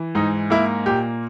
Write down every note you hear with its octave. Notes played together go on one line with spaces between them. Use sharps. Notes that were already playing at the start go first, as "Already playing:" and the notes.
Already playing: E3
G#2 D#4
A#3 E4
A#2 G4